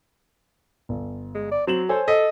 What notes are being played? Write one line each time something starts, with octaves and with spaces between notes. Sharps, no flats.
G1
G#3
D5
F#3 C4 E7 F#7
A4 C5 C#5 G#5
A4 D#5 B6